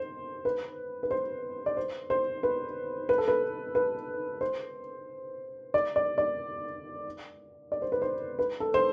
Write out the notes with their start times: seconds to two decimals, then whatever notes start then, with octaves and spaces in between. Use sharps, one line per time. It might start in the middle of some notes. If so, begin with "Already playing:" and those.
Already playing: C5
0.45 B4
1.03 B4
1.11 C5
1.66 D5
1.77 C5
2.10 C5
2.43 B4
3.09 B4
3.18 A4
3.28 B4
3.75 B4
4.41 C5
5.74 D5
5.96 D5
6.18 D5
7.72 D5
7.82 C5
7.92 B4
8.02 C5
8.39 B4
8.60 A4
8.74 C5